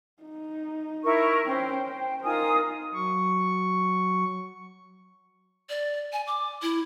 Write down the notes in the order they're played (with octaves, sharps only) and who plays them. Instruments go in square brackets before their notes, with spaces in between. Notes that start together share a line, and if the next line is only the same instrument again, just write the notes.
[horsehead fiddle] D#4
[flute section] E4 A#4 C#6
[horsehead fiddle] C#4 C5 [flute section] G5
[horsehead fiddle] C5
[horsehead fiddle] D#4 A#4 [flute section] F4 G#5 D#6
[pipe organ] F#3 C#6
[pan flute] D5
G#5
D6
E4